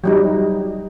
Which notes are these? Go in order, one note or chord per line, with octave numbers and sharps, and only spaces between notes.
F#3 G3 D#4